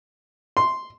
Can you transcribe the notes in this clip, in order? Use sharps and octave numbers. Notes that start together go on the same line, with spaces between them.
C6